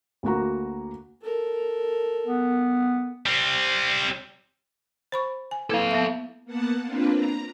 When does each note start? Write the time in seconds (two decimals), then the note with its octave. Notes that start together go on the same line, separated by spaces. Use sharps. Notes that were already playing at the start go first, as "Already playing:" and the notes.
0.23 D2 A#3 F#4 A#5
1.23 A4 A#4
2.27 B3
3.26 G3 C4
5.12 C5 B5 C#6
5.51 G#5
5.70 A#3 E4 A4 B4 F5
5.91 B3 E5
6.45 A#3 B3 F#5 A5
6.83 A#3 C4 D4 F4 B4
7.14 A#5